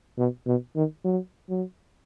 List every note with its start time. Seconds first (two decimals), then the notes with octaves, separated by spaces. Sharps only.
0.18 B2
0.47 B2
0.76 D#3
1.05 F#3
1.49 F#3